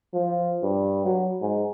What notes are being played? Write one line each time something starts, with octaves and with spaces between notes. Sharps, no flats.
F3
G2
F#3
G#2